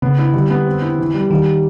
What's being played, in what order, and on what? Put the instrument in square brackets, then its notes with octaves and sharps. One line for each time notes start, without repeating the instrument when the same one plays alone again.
[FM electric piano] C#3 [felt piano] B3
[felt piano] E4
[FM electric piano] D3 [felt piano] G3
[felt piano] B3
C4
E4
E3
G3
[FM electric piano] D#3 [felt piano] G3